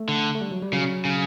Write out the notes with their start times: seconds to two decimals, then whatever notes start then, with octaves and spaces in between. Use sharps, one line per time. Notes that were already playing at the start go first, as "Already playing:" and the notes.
Already playing: A3
0.09 D3
0.35 A3
0.41 G3
0.51 F#3
0.62 G3
0.73 C#3 F#3
1.05 C#3